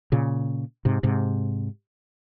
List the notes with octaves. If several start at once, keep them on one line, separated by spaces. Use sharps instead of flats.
A#2 C#3
G#2 C3
G#2 C3